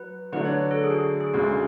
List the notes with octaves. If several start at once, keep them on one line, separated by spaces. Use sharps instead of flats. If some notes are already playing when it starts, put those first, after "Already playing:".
Already playing: F#3 B4
D3 F#3 A3 B4
C#5
A4
G#4
F#4
G#4
G#4
D2 C#3 G#3 F#4